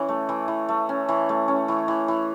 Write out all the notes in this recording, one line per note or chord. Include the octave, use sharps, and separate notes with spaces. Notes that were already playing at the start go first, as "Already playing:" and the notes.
Already playing: E3 C#4
A3
E3
E3
A3
C#4
E3
A3
C#4
E3
E3
E3